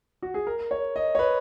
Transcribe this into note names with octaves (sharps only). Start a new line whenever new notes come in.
F#4
G#4
A#4
C#5
D#5
C#5
B4